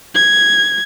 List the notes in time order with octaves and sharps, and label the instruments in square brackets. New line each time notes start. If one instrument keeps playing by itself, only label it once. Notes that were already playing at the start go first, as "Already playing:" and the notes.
[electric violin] G#6